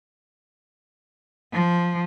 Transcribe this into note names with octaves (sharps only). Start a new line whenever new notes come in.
F3